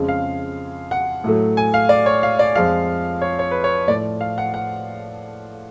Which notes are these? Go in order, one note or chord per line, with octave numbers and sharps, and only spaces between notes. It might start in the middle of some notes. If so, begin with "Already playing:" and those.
Already playing: F2 C#3 G#3
F5
F#5
A2 F#3 A3
G#5
F5
D5
C#5
F5
D5
F2 F3 G#3 F5
C#5
C#5
B4
C#5
A2 F3 A3 D5
F5
F#5
F#5